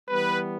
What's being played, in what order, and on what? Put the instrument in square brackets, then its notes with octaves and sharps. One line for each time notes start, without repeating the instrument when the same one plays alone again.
[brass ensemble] E3 G3 B3 B4